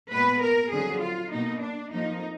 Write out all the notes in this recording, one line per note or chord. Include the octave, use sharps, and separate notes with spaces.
A#2 G#3 B3 B4
A#4
F2 D3 F#3 G#4
F4
B2 A#3 D#4
D4
F2 F3 A#3 D#4